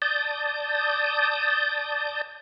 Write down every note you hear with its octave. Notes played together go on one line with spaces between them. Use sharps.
D5 A5 D#6 G6